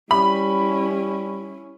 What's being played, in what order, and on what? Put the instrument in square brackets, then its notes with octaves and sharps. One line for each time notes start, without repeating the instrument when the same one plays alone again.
[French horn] G3 [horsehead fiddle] C#4 E4 [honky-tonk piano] B5